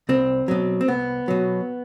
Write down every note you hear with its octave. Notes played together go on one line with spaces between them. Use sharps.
C2 C4
B2 F#3
C4
C2 B3
B2 F#3